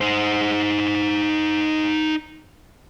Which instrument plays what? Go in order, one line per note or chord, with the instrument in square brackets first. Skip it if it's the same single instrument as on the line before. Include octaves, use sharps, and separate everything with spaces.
[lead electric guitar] D#4 C5